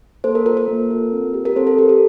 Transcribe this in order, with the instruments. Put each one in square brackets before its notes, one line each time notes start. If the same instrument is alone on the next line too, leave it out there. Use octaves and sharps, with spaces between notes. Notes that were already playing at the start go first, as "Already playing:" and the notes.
[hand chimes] A#3 A4 C5
A#4
F4 A#4
A4
A#4
A#3
F4 A4
C4
G4
A#4
C4 A4 C5
A4
G4 A4
A#4